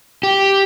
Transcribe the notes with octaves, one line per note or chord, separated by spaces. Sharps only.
G4